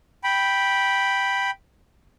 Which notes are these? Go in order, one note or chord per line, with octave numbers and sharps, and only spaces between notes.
G5 B5